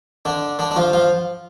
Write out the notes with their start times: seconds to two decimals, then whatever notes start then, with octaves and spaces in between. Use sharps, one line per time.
0.25 D3 D4
0.59 D3 D4
0.71 D4
0.76 F3 F4
0.93 F3 F4